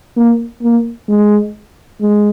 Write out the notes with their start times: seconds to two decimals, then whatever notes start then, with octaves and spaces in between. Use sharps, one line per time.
0.17 A#3
0.62 A#3
1.09 G#3
2.01 G#3